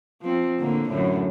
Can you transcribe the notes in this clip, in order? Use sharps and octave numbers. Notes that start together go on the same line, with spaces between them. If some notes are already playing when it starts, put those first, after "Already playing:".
F3 C4
A2 D3 A#3
F#2 A2 D3